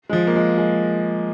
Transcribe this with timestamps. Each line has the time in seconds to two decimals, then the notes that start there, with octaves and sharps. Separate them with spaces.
0.09 G#3
0.13 F3
0.27 A#3
0.36 G#3
0.57 G#3